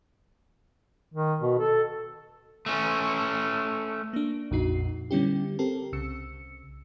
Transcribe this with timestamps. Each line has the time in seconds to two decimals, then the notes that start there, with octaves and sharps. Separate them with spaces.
1.14 D#3
1.41 B2
1.59 A4
2.66 A3 C#4
4.13 A#3 D4
4.51 A#1 F2 A#2 D#4 F#4 C7
5.11 D3 G3 B3 C#4 E4 G4
5.59 C4 G4 A4 A#4
5.93 C2 C#3 E6 C#7